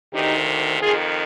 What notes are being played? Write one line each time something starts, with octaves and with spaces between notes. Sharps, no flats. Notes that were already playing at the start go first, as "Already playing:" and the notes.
D2 C3 D#3 D#4 G4
F2 D#3 F4 G#4